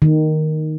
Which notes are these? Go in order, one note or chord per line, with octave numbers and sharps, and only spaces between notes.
D#3